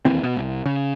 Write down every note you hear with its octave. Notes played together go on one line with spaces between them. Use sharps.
E1 D#2 E3 C4
B2
C2
C#3